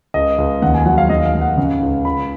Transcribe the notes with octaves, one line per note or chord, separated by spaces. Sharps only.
C#2 D#5
C#2
D#2 F#5
G#5
F#3 F#5
F5
D#2 D#5
F5
D#2
F#5
C#3
C#2
C#2 B5